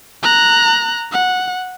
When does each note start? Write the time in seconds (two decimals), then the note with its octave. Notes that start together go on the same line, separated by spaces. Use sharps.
0.23 A#5 F#6
1.12 F#5